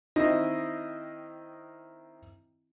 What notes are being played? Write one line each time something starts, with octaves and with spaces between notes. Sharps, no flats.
D#3 C4 E4 D#5